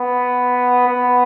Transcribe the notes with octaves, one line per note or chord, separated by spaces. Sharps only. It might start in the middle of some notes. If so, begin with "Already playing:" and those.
Already playing: B3
B3